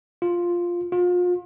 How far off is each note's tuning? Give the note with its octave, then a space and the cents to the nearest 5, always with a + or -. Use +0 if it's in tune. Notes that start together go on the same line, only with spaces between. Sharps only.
F4 +0
F4 +35